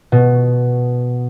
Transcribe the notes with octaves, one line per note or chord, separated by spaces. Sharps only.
B2